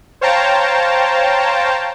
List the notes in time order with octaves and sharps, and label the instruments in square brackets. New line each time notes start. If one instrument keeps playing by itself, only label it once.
[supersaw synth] C5 C#5 F5 G5 A5 A#5